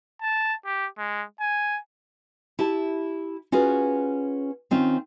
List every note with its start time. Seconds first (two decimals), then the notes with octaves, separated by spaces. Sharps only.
0.21 A5
0.65 G4
0.98 G#3
1.40 G#5
2.59 E4 G4 A5
3.52 C#4 F4 F#4 G#4 B4
4.71 D#3 C4 C#4 F4